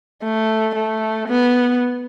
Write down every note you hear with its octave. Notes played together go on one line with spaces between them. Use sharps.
A3
A3
B3